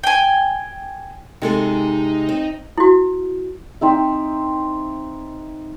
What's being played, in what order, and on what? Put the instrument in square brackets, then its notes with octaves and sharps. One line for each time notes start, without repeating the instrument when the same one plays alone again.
[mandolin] G5 G#5
[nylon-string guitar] C3 G#3 A4 [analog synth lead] D#4
[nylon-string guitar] C4
[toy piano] E4 F#4
[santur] C4 D#4 E5